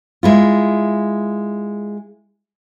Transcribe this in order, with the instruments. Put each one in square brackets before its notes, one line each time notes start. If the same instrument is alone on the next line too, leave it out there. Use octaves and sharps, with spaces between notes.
[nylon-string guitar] G#3 E4 F4